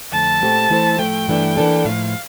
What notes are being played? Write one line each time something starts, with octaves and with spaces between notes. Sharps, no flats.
F2 D3 A3 A5
A#2 A3 C4 G4
E3 A3 E4 A4 C5
A2 F3 A3 G5
G2 E3 A3 D4
E3 A#3 D4 A4
A2 F3 A#3 F5